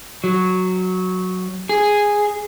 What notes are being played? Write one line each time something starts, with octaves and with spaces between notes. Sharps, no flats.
F#3
G#4